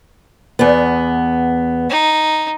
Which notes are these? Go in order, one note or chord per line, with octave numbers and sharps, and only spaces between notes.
E2 B3
D#4